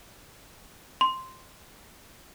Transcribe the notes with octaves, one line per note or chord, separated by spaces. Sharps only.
C6